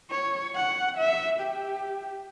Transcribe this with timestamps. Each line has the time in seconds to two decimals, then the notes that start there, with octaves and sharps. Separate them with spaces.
0.11 C#5
0.56 F#5
0.98 E5
1.40 G4